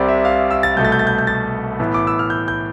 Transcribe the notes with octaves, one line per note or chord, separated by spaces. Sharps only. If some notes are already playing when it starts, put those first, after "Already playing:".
Already playing: C2 C3 G3 C5 D5
E5
F5
E6
A6
C2 B2 A3 G6
A6
G6
A6
G6
G6
A6
A2 E3 B3
D6
E6
F6
G6
G6